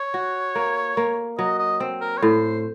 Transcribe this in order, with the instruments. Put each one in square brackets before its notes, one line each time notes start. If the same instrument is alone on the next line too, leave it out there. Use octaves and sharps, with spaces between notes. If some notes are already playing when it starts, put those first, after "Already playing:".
Already playing: [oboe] C#5
[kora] F#4
A#3
A#3
[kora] F#3 [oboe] D#5
[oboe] D#5
[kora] C4
[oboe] A#4
C#5
[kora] A2 [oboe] C5